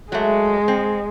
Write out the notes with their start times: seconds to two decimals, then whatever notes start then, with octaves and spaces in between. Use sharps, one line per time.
0.12 F#3 G#3 A3
0.68 C4